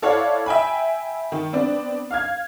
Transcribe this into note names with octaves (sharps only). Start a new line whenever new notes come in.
E4 A4 C#5 D5 F5 F#5
E5 G5 G#5 B5
D#3
B3 C4 D4
F5 F6 G#6